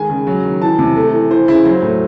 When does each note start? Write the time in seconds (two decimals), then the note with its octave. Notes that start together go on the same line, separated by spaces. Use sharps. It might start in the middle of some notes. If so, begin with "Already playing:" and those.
Already playing: D#3 G#3 G#5
0.10 C#3
0.27 F#3
0.44 D#3
0.62 E3 A5
0.79 C3
0.96 A3
1.13 E3
1.30 E3 C5
1.48 C#3 E4
1.65 F#3 C5
1.82 A2